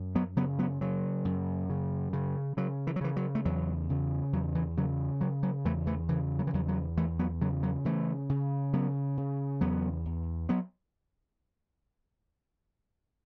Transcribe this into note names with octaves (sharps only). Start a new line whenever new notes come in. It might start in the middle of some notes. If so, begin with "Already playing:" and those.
Already playing: F#2
F#3 B3
C#3 F#3 B3
F#3 B3
C#3 F#3
F#2
C#3
C#3
C#3 F#3
E3
F#3
C#3 E3
F#3
A3
E2 F#3
C#3
E2 F#3
E3
C#3 F#3
C#3 F#3
F#3
E2 E3 A3
E3 A3
C#3 E3
F#3
E3
E2 F#3
F#3
E2 E3 A3
F#3 B3
C#3 F#3
F#3
C#3 E3 A3
C#3
C#3 F#3 B3
C#3
E2 F#3 B3
E2
F#3 B3